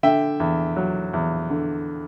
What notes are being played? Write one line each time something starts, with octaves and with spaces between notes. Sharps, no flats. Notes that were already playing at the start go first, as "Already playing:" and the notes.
D3 E5 G5
E2
F#3
E2
D3